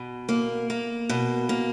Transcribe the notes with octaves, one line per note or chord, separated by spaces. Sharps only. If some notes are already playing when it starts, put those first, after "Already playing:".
Already playing: B2
A#3
A#3
B2
A#3